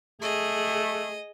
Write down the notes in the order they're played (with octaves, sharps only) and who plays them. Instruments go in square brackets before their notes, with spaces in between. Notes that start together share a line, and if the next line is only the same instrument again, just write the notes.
[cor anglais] A3 [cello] G#4 [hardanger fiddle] D#5